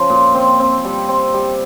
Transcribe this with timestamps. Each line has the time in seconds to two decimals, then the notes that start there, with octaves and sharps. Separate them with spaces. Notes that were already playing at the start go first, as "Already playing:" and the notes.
Already playing: F3 C#4
0.10 A#2
0.35 C4
0.59 C4
0.85 G3
1.09 C4
1.34 G3